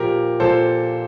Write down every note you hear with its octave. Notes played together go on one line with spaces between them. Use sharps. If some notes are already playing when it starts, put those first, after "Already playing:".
Already playing: A#2 F3 G4 A#4
A#2 F3 A4 C5